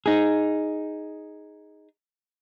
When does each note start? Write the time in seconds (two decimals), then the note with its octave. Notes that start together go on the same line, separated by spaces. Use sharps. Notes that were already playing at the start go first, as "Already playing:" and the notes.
0.06 D#4 G#4